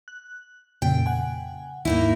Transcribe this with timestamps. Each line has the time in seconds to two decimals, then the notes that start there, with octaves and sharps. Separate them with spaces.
0.08 F#6
0.82 F2 A#2 C#3 G5
1.06 F#5 G#5
1.85 D#2 G#2 A#3 D#4 E4